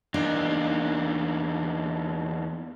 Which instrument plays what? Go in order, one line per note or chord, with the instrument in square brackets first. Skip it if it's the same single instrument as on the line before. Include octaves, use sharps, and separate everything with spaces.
[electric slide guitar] E2 A#3 D#4 [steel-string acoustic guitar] D4